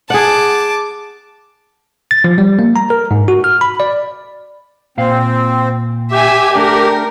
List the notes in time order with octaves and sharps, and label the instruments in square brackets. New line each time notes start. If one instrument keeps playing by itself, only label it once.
[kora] G#4 F#5 [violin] A5 D6
[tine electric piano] A6
F3
G3
A#3
A#5
A#4
G#2
F#4
F6
B5
D5
[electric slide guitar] A#2 F5 [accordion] C4
[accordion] G4 [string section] E5 G#5
[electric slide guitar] A3 D4 [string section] A#4